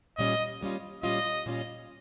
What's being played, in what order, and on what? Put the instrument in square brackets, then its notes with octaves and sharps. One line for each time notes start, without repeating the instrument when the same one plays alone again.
[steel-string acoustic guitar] A#2 G3 C#4 F4 [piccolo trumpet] D#5
[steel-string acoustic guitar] A#2 G3 C#4 F4
[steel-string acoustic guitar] A#2 G3 C#4 F4 [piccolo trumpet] D#5
[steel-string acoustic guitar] A#2 G3 C#4 F4